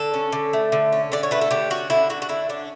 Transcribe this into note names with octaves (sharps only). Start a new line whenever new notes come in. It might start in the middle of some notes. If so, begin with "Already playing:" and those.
Already playing: D3 A4
C#4
D3
A3
D3
C#4
D3 D5
C#5
A3 B4
A4
D3 G4
C#4 F#4
D3 E4
A3 F#4
F#4
D3 E4
C#4 D4